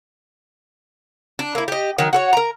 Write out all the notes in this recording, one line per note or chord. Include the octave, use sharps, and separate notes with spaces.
D4
A#3 E4
G4 D#5
D#3 F#3
F#4 A4 C#5
A#4 A#5